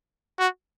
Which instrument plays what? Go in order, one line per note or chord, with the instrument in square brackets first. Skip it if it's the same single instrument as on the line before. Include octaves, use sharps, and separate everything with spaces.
[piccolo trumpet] F#4